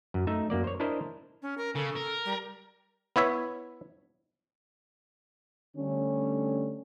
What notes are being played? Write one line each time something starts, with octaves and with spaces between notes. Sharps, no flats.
F#2
A3 D#4 E5
F#2 A#3 D5
C5 C#5
D4 E4 A#4 C5 D#5
C#4
A#4
C#3 A4
A#4
G3
B3 E4 C#5 E5
D3 G3 A3 C#4